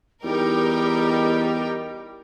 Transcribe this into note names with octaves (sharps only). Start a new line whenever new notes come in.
E2 G3 D#4 G4 A#4 G5